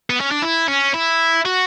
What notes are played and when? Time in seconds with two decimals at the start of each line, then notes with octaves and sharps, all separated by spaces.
0.10 B3
0.20 C#4
0.31 D4
0.42 E4
0.68 C#4
0.94 E4
1.45 F#4